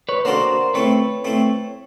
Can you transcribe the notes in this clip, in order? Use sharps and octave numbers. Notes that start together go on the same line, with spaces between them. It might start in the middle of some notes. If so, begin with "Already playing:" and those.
B4 C#5
A#3 D4 F#4 A4 A#4 C5
A3 C4 E4 B4 C#5
A3 C4 E4